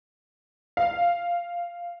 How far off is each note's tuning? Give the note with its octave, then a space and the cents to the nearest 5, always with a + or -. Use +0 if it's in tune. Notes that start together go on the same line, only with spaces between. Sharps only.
F5 -15